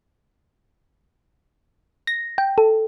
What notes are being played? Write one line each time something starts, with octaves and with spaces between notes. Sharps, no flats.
A#6
G5
A4